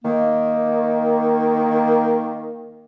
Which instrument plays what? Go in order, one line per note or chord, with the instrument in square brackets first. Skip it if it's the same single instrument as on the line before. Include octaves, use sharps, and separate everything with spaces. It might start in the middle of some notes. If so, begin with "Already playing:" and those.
[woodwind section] D#3 A#3